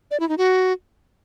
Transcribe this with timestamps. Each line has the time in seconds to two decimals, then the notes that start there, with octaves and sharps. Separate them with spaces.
0.11 D5
0.20 E4
0.29 D#4
0.38 F#4